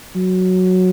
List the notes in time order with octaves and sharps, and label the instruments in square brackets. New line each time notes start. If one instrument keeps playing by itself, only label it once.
[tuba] F#3